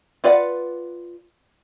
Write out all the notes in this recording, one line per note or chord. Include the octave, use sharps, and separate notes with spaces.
F4 B4 D5 E5 F#5